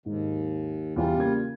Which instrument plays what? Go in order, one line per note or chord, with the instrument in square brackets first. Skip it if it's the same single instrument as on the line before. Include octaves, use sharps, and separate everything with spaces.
[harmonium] D#2 [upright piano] G#2
[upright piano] E2 [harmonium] G3 F4
[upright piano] C#3 A#3 G#6